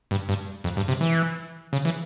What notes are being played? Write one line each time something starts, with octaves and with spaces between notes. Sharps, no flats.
G2
G2
F2
G2
C3
E3
C#3
E3